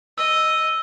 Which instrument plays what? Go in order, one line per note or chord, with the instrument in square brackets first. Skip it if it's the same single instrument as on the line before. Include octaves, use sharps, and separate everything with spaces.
[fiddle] D#5 [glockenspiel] E6